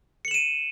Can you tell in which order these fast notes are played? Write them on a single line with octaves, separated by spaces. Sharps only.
C#7 F#7 E7 D#7